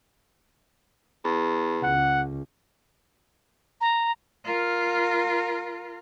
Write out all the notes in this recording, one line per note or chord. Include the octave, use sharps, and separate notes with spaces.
E2
C#2 F#5
A#5
F4 A#4